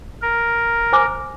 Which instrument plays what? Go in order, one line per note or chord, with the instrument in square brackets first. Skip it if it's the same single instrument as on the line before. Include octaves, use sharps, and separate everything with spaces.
[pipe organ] A#4
[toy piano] C5 G#5 D6